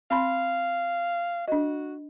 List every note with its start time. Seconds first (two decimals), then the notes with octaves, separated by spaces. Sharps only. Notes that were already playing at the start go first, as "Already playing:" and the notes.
0.11 C4 F5 B5 C6
1.48 D4 F#4 D#5